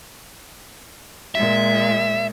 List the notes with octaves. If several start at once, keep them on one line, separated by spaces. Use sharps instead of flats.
A#2 G#3 E5